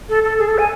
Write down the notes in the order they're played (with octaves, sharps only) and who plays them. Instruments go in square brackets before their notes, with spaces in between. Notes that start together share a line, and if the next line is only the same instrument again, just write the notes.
[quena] A4
A4
G#4
A4
G#5